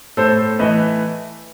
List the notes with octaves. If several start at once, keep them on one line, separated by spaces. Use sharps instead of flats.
A2 A4 C5
E3 A3 B4 D#5